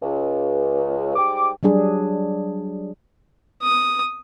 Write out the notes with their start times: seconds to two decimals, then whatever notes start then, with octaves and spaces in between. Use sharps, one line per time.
0.03 C#2
1.16 G#2 G3 G5 D6
1.63 F#3 G3 D4 G#4
3.62 D#6